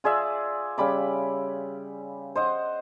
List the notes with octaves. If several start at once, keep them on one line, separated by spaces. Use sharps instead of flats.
F4 G#4 D5 E5
C#3 G3 B5 D6
C5 D#5 F#5